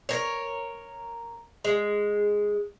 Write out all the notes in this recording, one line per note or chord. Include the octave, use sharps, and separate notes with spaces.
A#4 C#5
G#3